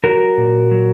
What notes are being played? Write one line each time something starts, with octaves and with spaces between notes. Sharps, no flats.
F#3 F#4 A#4
A#2
F#3